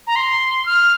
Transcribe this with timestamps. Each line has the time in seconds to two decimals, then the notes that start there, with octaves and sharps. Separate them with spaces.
0.07 A#5
0.16 C6
0.66 F6